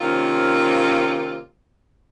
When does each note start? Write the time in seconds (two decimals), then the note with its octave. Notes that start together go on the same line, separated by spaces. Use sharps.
0.01 C3 D#3 A#3 C4 C#4 F4